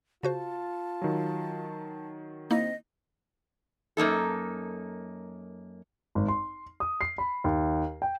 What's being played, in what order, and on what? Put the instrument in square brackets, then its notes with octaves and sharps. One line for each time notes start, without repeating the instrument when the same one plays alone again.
[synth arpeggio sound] C#3 F#4 C5 [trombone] F4 [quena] A5
[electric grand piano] D#3 F#3
[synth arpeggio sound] A#3 D#4 E4 [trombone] C4 [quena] D#5
[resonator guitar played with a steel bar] F#2 A#3 D#4 A4
[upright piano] G#1
C6
D#6
C7
B5
D#2
G5